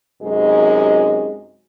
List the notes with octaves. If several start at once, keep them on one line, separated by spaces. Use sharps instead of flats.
F#2 C3 G#3 D#4 F#4